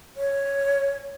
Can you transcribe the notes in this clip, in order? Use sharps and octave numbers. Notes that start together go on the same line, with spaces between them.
C#5